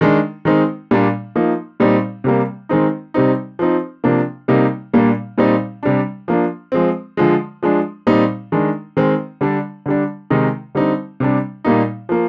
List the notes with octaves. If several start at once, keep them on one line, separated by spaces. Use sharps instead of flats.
D#3 G#3 D4
D#3 G#3 C4 D#4
A#2 G3 A#3 D4
F3 A#3 D#4
A#2 G3 C4 D#4
C3 G3 A#3
D#3 G#3 C4 D#4
C3 G3 C4 D#4
F3 C4 D#4
C3 F3 A#3 D4
C3 G3 A#3 D#4
A#2 G3 A#3 D4
A#2 G3 C4 D#4
C3 G3 D4
F3 A#3 D4
F3 G#3 C4
D3 F3 G#3
F3 G#3 D4
A#2 G3 C4 D#4
D#3 G#3 D4
D#3 G#3 C4
D3 G3 D4
D3 G3 D4
C3 D#3 G#3 D#4
D3 G3 C4 D#4
C3 G3 D4
A#2 G3 A#3 D#4
F3 A#3